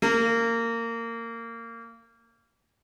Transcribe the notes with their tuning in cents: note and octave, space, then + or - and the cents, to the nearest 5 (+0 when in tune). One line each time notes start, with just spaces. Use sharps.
A#3 -20